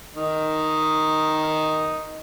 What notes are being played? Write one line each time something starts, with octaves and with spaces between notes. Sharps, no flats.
D#3 D#4